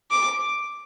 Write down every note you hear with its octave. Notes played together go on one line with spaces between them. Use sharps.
D6